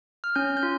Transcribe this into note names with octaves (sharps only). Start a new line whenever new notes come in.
F6
C#4 G6
G6
F4